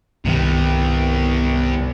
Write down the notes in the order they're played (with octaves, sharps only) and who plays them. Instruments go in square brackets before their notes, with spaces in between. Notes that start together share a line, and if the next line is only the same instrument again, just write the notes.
[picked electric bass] C2 G2 D#3 [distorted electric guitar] C3 G3 [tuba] B3